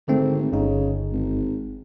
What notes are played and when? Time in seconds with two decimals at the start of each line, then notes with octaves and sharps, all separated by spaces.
0.08 G#1 D3 A3 C4
0.52 G1 C#3 D#4
1.12 G#1